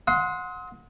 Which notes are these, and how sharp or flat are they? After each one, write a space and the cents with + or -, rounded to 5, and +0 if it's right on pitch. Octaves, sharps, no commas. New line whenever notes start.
F#5 -25 C6 +0 D#6 +40